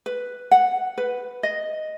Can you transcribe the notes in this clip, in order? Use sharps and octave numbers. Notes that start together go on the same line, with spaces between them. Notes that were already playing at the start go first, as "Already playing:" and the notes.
B4
F#5
B4
D#5